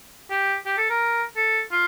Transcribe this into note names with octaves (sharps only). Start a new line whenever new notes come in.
G4
G4
A4
A#4
A4
F4